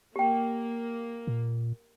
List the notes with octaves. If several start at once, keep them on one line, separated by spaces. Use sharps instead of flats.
A#3 G4 G5
A#2